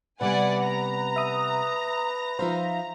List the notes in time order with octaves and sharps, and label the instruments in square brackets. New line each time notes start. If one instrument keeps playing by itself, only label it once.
[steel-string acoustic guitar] C3 G3 B3 [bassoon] B4 [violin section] D5 F#5 G#5
[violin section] A#5
[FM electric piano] E5 D#6 A#6
[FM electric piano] F3 C5 [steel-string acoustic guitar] D#4 E5 F5